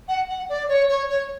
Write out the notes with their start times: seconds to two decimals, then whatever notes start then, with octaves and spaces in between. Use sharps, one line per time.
0.08 F#5
0.29 F#5
0.49 D5
0.69 C#5
0.89 C#5
1.09 C#5